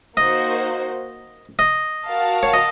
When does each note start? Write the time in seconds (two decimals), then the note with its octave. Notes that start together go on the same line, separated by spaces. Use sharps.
0.17 A#3 D#4 F#4 C5 D#5
1.59 D#5
2.06 F#4 A#4 F5 A5
2.43 C#5
2.54 D#5